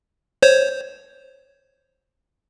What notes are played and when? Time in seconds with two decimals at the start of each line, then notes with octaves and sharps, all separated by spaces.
0.43 C5 C#5